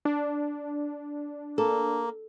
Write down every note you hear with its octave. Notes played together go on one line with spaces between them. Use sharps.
D4
A#3 A4